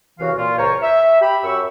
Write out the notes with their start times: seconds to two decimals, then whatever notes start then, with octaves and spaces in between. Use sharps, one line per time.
0.19 C2 C#3 E3 F#4 F5
0.37 A#2 F4
0.58 C#2 A#4 C5 C#5
0.82 E5
1.22 G4 B5
1.44 F#2 C#6 E6